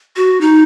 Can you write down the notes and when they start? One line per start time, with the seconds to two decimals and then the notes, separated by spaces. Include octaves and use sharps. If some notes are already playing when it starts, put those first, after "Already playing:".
0.16 F#4
0.41 D#4